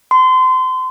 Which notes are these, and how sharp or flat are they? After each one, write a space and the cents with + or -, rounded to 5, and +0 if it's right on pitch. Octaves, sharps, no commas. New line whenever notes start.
C6 -30